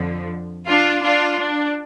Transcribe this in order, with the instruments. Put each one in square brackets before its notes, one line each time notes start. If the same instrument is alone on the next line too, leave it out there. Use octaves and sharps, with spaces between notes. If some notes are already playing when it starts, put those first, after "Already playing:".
Already playing: [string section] F2 D3 F3
D4 F4
D4 F4
D4